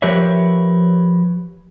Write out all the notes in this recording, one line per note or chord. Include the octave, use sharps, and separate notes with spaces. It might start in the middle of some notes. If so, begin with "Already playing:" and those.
F3 G4 A#4 B4 C#5 E5